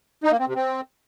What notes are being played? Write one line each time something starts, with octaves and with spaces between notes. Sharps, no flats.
D#4
A#3
C4
C3
C4